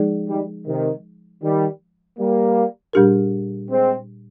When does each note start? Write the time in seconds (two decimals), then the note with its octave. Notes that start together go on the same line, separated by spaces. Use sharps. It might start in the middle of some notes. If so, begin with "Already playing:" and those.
Already playing: F3 G#3 D#4 G#4 D5
0.28 D#3 G3
0.66 C3 D#3
1.42 D#3 G3
2.18 G3 A#3
2.93 A#2 G3 D4 G4 A#4
3.69 G#3 C4